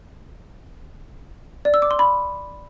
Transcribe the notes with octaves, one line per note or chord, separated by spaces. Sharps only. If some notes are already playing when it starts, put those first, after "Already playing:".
D5
E6
D6
C6
B5